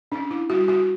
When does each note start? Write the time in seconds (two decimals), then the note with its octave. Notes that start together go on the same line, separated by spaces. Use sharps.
0.12 C#4 D4
0.30 E4
0.49 G3 F#4
0.68 F#4